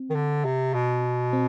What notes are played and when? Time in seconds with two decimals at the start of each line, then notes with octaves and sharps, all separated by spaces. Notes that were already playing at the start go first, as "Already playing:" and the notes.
Already playing: C4
0.10 D#3
0.15 D3
0.45 C3
0.74 B2
1.33 C4